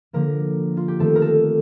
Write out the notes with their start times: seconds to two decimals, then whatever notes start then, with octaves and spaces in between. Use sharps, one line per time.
0.13 D3 F3 A#3 A#4
0.77 F4
0.88 G4
0.99 D#3 A3 C4 A4
1.15 A#4
1.22 A4